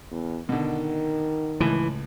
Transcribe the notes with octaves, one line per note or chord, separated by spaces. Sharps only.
E2
B2 D3 D#3
C#2 A2 E3